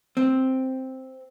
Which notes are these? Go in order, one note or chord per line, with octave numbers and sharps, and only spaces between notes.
C4